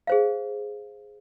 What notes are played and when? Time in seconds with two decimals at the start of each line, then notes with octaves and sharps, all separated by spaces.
0.07 G#4 C5 F5